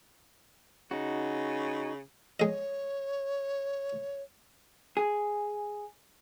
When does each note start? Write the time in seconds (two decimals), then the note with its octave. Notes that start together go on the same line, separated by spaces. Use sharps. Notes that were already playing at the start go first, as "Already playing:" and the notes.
0.91 C#3 D#4 F#4
2.40 G#3 C#5 D#5
4.97 G#4